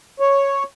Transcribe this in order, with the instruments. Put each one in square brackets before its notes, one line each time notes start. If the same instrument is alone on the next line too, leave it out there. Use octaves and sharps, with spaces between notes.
[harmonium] C#5